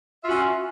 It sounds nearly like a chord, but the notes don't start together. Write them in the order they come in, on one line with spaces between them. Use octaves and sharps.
F4 E5 F#4 C#4